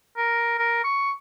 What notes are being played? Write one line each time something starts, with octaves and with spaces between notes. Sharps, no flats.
A#4
A#4
C#6